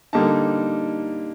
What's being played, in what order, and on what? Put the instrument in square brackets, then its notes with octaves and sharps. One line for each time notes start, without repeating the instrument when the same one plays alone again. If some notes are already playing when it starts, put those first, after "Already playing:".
[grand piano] D3 G3 A#3 D#4 A5